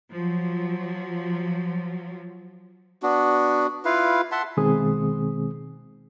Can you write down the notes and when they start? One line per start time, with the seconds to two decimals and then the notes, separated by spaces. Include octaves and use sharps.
0.10 F3 F#3
3.03 B3 D4 F#4
3.85 E4 F4 B4 F5
4.32 E5 F#5 A5 C6
4.57 B2 D#3 G#3 C4 G#4 D#6